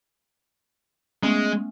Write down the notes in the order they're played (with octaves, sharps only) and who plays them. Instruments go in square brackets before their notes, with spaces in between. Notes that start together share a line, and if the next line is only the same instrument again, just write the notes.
[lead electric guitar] G#3 [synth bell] A3 B3 C#4